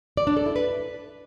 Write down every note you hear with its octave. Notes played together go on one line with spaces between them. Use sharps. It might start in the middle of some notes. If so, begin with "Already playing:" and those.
D5
D4
A4
E4
B4